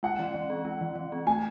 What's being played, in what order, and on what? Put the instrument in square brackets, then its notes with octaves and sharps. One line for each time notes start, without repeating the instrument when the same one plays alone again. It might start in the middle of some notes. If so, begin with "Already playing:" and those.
[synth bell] G#3 [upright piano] F#5
[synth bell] E3
E3
C4
G#3
E3
E3
C4
[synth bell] A3 [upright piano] G#5